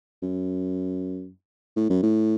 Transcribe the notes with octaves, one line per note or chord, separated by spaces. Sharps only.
F#2
A2
F#2
A2